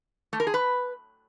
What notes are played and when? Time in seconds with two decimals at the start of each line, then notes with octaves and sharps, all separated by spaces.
0.33 A3
0.40 A#4
0.47 G#4
0.54 B4